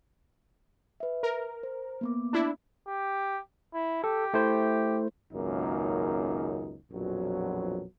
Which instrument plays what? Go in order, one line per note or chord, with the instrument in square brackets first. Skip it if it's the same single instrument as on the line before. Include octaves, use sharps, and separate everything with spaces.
[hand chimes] B4 E5
[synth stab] A#4
[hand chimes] C5
A#3 B3 D6
[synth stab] D4 E4
[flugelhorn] G4
E4
[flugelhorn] G4 [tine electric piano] A4
[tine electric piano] A3 E4 C5
[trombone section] G#1 C#2 F#2 A#3 D#4
A#1 F2 B2 F#3